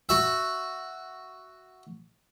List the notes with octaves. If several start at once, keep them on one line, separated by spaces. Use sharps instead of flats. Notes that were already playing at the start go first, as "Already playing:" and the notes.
F#4 E5